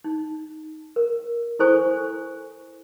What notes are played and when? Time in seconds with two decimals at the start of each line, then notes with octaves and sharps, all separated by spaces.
0.04 D#4
0.96 A#4
1.59 E4 A4 C5 G#5 C#6